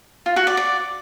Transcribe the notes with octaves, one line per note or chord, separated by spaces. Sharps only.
F4
F#4
D5
D5